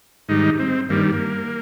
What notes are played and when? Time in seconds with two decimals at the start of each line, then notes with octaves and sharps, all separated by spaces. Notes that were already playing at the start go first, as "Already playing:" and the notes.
0.29 G#2 D#3 G3 D#4
0.59 C4
0.89 G2 D#3 G3 A#3
1.12 A#3